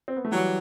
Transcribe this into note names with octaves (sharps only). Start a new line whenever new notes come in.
C4
B3
A3
E3 F#3 G3